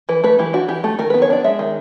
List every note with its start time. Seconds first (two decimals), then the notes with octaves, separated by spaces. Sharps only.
0.09 E3 B4
0.24 A3 B4
0.39 E3 G4
0.53 D4 F#4
0.68 E3 G4
0.84 A3 A4
0.99 D#3 A#4
1.10 B4
1.14 B3
1.22 C#5
1.30 D4 D5
1.44 G#3 E5
1.59 D#3